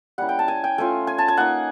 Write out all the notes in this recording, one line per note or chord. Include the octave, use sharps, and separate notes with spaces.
G3 A#3 C#4 E4 F#5
G5
A5
G#5
G5
A3 C#4 F4 G#5
G#5
A5
G#5
A#3 D#4 F#5